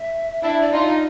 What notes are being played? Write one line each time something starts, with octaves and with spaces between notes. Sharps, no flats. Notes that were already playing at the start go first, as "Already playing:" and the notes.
Already playing: E5
D4 E4 E5
D5
D#4 F4 D#5
D#5